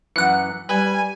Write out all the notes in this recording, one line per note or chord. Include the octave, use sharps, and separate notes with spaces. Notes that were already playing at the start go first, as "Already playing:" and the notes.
F#2 E3 F#5 C#7
G3 B4 G#5